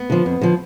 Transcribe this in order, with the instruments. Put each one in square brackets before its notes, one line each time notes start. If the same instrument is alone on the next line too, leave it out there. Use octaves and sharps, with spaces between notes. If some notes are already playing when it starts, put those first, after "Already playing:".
Already playing: [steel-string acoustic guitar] B3
D3 F3
F2
D3 F3